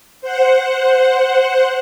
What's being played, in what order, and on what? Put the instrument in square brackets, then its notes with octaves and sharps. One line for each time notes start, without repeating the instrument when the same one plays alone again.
[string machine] C5 F#5